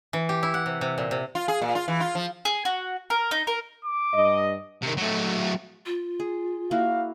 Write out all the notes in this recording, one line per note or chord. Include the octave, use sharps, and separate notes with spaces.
E3
G4
E4
F#5
C3
C3
A#2
C3
F4
G#4
A#2
F4
E3
F4
F3
G#4
F#4
A#4
D#4
A#4
D6
G2 D#5
C3 D#3
F#3 A3
F4
G#4
A#3 E4 F#4 F5